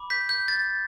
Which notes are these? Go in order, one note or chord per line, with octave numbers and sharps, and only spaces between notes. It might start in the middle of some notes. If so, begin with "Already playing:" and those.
Already playing: B5 D6
G6 B6
G6
A6